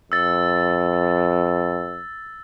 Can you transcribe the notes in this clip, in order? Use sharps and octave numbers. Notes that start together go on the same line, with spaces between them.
F2 E6 A6